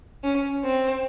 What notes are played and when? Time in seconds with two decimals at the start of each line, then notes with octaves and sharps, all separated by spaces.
0.24 C#4
0.64 C4